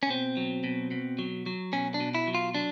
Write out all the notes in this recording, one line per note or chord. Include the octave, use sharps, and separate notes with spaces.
C#4
B2 C4
F#3
B2
B2
F#3
F#3
B2 C#4
D4
B2
E4
F#3
F4
F#3 D4